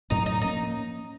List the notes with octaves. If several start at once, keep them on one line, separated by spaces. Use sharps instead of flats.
A2 F#3 C4 D#4
D#4
F3 A#3 C#4 D#4